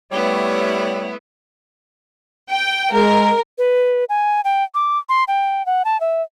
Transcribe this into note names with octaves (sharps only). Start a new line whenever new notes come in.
G3 A3 B3 E4 C#5
G5
G#3 A#4
B4
G#5
G5
D6
C6
G5
F#5
A5
E5